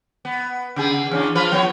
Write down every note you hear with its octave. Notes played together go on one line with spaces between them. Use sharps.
B3
C#3 B3 G#4
E2 C#4 D4
F3 F4 B4
F3 B3 C#5